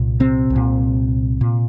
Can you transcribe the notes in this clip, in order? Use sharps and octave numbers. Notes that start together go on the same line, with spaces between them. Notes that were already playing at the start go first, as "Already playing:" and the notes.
Already playing: C2 A#2
C3 C4
C2
A#2
A#2